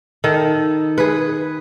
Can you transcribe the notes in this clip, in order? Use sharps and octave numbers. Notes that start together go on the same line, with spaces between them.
D#3 A4
G#4 B4